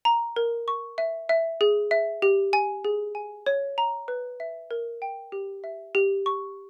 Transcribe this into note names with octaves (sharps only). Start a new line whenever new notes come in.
A#5
A#4
C#6
E5
E5
G#4
E5
G4
G#5
G#4
G#5
C#5
A#5
B4
E5
A#4
G5
G4
E5
G4
C#6